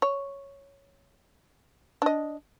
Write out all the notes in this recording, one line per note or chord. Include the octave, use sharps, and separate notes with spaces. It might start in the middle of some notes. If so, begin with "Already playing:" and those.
C#5
D4 D#5